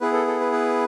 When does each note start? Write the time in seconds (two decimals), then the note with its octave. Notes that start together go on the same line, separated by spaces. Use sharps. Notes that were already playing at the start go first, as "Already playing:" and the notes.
0.01 B3 E4 G#4 B4
0.13 A4
0.28 A4
0.40 B4
0.53 B4